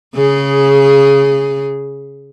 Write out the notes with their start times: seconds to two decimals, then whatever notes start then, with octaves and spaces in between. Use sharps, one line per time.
0.15 C#3 G#4